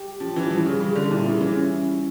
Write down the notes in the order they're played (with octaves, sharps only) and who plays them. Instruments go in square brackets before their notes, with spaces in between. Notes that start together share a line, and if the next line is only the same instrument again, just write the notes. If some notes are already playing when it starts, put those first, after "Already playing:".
Already playing: [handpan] G4
[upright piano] F3 [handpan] C#4
[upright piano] E3
F3
[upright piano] E3 [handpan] G3
[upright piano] C#3
[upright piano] C#3 [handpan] G3
[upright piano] D3
[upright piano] A#2 [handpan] E4
[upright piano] C#3
[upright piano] E3 [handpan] C#4